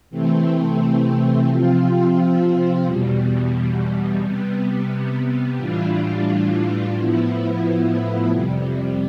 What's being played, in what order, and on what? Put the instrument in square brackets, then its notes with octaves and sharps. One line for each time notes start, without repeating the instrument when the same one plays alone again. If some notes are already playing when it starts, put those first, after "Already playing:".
[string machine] C3 E3 A3 C4
C3 F3 C4 F4
E2 B2 G3
C3 G3 B3
A2 E3 G3 D4 F4
A2 F3 B3 E4
F2 C3 G3